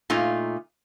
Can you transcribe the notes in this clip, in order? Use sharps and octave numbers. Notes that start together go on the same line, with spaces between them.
A#2 A3 D#4 F4